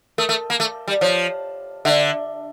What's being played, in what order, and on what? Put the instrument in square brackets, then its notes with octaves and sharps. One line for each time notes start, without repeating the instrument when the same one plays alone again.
[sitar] A3 [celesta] A#4
[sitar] A3
A#3
A3
G3
[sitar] F3 [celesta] C#5
[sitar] D3 [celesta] E5